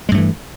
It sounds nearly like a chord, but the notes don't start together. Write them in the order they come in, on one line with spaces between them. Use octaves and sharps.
G#3 G2 A3 E3